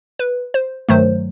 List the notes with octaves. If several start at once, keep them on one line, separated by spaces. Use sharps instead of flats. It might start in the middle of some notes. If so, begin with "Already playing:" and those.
B4
C5
G2 D#3 F#3 A3 C5